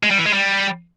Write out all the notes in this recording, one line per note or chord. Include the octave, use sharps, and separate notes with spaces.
G#3
G3
E3
G#3
G3